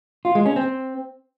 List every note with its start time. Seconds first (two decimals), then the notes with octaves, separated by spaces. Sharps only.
0.25 F4
0.35 G#3
0.46 C#4
0.56 C4